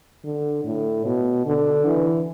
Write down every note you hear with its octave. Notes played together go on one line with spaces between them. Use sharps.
D3
A2
B2
D3
E3